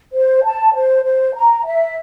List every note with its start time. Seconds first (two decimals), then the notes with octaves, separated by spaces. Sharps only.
0.12 C5
0.43 A5
0.73 C5
1.03 C5
1.34 A#5
1.65 E5